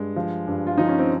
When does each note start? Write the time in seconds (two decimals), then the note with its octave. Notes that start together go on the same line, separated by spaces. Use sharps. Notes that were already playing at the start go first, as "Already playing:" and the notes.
Already playing: G2 G#3
0.16 F3
0.48 G2
0.67 F4
0.78 F3 D#4
0.88 C#4
0.99 C4